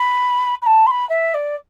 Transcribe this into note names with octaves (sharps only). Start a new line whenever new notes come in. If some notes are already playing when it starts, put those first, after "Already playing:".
Already playing: B5
B5
A5
C6
B5
E5
D5